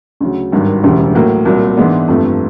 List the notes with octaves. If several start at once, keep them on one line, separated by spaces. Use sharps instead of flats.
D2 C#3 F#3
G#1 G2 D#3 F#3
E1 D2 C#3 E3 G3
A2 F#3 A#3
C2 A#2 F#3
G#2 E3 G#3 B3 D4
G1 F2 C3 F3 A3